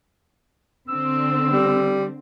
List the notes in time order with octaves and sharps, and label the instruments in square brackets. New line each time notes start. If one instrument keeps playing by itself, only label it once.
[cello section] D3 C4 [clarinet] E6
[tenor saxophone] G3